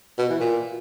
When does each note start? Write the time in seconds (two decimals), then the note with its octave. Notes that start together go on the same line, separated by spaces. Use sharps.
0.19 B2
0.30 E3
0.40 A#2